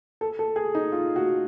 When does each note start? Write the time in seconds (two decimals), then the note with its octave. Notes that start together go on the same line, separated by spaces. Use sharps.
0.21 A4
0.39 A4
0.56 G#4
0.75 D#4
0.92 F4
1.16 F#4